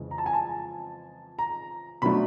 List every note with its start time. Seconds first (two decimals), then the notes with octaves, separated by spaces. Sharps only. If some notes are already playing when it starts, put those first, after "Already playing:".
Already playing: F2 C#3 E3 G#3
0.11 A#5
0.18 A5
0.26 G#5
0.33 A5
1.39 A#5
2.02 B2 F#3 A3 D4 B5